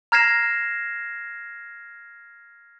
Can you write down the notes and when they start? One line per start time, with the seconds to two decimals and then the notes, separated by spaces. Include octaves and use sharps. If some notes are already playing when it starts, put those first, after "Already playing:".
0.12 A#5 F6 G#6 A#6 C7 E7